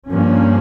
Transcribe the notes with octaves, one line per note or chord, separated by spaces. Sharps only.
G2 F3 A#3 C#4